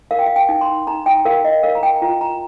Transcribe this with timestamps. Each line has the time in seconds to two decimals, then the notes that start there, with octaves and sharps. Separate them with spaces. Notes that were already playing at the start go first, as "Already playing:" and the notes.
0.11 A#4 F5
0.19 G5
0.26 F5
0.36 G5
0.49 D#4
0.61 C6
0.87 D#4 A#5
1.06 G5
1.25 A#4 F5
1.44 D#5
1.63 A#4 F5
1.75 A#5
1.83 G5
2.02 F4 A#5
2.21 A#5